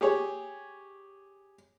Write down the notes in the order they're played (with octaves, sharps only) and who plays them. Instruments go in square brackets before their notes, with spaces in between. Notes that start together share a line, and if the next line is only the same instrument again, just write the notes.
[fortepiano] G4 G#4 C#5